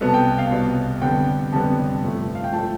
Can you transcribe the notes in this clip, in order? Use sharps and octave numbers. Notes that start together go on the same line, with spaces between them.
C2 B2 B3 A4
A5
G5
F5
C2 B2 B3
F2 D3 G3 B3 G5
F2 D3 G3 B3 A5
G2 F3 A3
F5
G5
F3 A3 A5